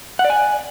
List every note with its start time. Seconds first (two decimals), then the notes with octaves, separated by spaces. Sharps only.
0.19 F#5
0.25 D5
0.30 G#5